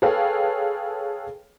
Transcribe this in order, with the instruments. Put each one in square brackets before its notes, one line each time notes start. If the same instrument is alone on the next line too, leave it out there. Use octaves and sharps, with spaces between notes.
[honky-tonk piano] G#4 A4 B4 C#5 F5 G5